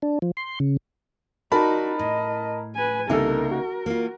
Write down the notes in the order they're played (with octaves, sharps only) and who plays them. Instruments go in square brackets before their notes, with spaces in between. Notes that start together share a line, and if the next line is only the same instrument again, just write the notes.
[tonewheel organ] D4
F3
C6
C#3
[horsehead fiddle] D#4 F#4 [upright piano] A#4 A5 B5 [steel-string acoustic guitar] D5
[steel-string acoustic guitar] A2 [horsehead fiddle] D#5
[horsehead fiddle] B4 G#5
[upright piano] C2 A4 [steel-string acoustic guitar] C#3 A#3 D#4 [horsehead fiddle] A#4
[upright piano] F#4
[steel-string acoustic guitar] A#3 F4